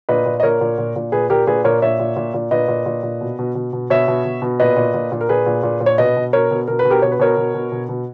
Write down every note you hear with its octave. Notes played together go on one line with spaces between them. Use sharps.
A#2 B4 D#5
A#2
D#5
A#2 A#4 C#5
A#2
A#2
A#2
A#2 G#4 B4
A#2 G4 A#4
A#2 G#4 B4
A#2 A#4 C#5
A#2 C#5 E5
A#2
A#2
A#2
A#2 B4 D#5
A#2
A#2
A#2
B2
B2
B2
B2
B2 C#5 E5
B2
B2
B2
A#2 B4 D#5
A#2
A#2
A#2
A#4
A#2 G#4 B4
A#2
A#2
A#2
C#5
B2 B4 D#5
B2
B2 A#4 C#5
B2
B2 A#4
B4
B2
G4 A#4
B2 C#5
B4
B2 A#4 C#5
B2
B2
B2
B2